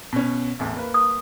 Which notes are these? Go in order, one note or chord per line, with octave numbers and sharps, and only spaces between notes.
B2 C#4
A1 E2 A2
A#3 B4
D#6